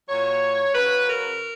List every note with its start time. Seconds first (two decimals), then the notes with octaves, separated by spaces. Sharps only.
0.08 A#2 F#3 C#5
0.75 C#3 F#3 B4
1.08 A#4